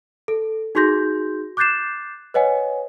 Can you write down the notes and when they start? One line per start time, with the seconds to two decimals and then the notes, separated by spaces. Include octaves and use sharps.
0.28 A4
0.75 D#4 F#4 G#4 C6 G6 A#6
1.57 D6 F#6 G6 A6 C7 E7
2.34 B4 C#5 D#5 F#5 G#5